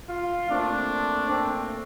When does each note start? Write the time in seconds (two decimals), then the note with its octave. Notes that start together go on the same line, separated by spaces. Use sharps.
0.09 F4
0.49 A#2 A3 C4 D4
1.30 C4